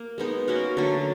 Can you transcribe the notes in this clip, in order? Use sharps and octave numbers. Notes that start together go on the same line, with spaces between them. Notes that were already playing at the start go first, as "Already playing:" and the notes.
Already playing: A#3
G#3 B3 D#4
A#3 C#4 F#4 A#4
D3 F#3 A3 D4